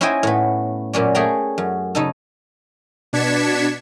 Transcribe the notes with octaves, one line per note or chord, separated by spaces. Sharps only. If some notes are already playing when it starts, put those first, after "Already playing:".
C#4 E4 C5 D#5 G5 G#5
A2 B3
F#2 A#2 C#4 D5
A3 G#4 G5 A#5
F#2
C#3 D#4 A4
B2 D4 G#6 B6 C#7 E7